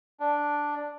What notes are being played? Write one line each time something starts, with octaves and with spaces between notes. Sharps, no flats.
D4